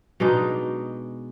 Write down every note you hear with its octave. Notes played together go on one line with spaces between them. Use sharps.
B2 G#3 D4 D#4